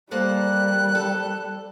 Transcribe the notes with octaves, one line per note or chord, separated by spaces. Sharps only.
G3 A#3 A4 C5 F#6
A4